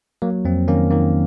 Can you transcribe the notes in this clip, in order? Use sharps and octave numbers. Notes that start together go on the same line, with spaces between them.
F#3 A#3
F2 C4
D#3 A#3 C#4
D#3 A#3